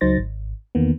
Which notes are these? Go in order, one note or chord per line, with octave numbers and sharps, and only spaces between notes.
C#2 F#3 D#4 C5 A6 A#6
G#1
E2 D#3 A#3 B3